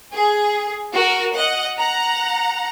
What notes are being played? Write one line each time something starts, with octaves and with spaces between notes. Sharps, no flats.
G#4
F#4 A#4
D#5 F#5
F#5 A#5